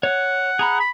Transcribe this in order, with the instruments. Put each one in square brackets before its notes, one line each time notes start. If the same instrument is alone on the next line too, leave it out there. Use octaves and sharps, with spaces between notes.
[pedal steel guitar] C#5 [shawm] F#5
[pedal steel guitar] G#4 A#5 B5
[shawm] B5